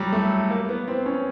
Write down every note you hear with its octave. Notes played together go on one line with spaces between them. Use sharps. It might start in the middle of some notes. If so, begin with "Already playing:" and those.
Already playing: F#3 G3
A3
A#3
B3
C4
C#4